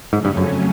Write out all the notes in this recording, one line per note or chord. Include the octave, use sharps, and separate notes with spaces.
F2 G#2 C#3 F#3 A3 C#4
G2
F#2